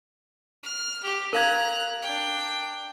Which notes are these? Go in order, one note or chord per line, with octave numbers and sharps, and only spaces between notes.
F6
G4
A#4 F5 A#5 F#6 G#6
D4 G5